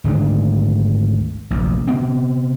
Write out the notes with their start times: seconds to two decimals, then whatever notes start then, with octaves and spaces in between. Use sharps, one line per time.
0.04 G#1 D2 G#2 D4
1.51 F1 A#1
1.87 C3 B3 C4